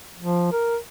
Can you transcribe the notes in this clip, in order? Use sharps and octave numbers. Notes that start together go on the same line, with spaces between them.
F3
A#4